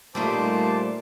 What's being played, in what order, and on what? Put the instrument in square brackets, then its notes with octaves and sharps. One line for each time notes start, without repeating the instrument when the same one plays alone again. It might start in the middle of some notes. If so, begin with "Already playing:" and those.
[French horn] A#2 [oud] G3 A3 D#4 [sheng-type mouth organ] C5 A5 D6